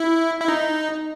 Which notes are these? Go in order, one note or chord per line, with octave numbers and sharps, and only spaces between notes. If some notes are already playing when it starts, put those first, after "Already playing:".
Already playing: E4
E4
D#4